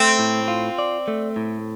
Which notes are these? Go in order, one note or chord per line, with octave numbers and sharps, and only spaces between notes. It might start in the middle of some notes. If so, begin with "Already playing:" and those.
Already playing: A3 C4
A2
F4
D5
A3
A2